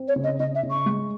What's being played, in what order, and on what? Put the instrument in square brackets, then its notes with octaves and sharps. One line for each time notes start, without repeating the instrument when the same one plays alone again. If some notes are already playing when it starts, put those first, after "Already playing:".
Already playing: [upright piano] C4
[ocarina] C#5
[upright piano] C#3
[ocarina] D#5
[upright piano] C#3 [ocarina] D#5
[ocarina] E5
[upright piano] C#3
[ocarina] C#6
[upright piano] G#3